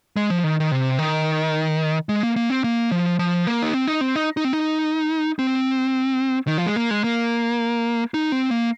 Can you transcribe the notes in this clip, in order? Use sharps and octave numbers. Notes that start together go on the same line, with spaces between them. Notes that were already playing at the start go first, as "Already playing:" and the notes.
G#3
F3
D#3
D#3
C3
D#3
G#3
A#3
A#3
C4
A#3
F3
F3
A#3
D#4
C4
D#4
C4
D#4
D#4
C4
D#4
C4
D#3
F3
G#3
A#3
G#3
A#3
D#4
C4
A#3